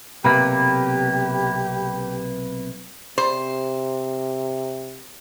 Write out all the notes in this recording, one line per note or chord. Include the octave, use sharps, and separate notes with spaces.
B1 C3 A#3 G4 B4
C3 C5